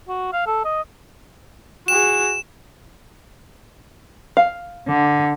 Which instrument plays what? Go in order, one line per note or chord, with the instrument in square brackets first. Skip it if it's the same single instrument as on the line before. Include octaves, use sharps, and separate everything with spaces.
[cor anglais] F#4
F5
A4
D#5
[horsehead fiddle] F#4 G#4 [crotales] E7
[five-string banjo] F5
[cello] D3